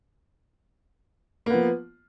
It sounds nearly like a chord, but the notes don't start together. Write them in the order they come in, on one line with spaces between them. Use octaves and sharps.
A#3 B3 F3